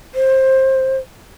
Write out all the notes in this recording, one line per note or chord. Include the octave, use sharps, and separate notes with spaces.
C5